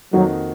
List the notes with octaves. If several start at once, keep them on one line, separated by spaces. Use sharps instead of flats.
F2 D#3 F#3 A#3 D#4 F#4